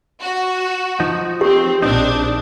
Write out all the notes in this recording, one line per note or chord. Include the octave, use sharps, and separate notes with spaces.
F#4
F3 D#4
C4 G4
A#1 C4 D4 D#4